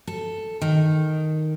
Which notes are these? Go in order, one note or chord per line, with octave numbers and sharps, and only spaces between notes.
A4
D#3